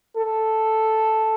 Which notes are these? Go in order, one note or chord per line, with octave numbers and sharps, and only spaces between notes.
A4